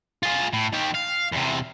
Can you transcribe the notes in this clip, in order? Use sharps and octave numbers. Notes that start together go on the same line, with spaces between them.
F4 G#4
A2
D#3 G4
F5
E2 C3